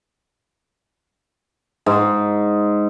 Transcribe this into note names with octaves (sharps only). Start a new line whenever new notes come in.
G#2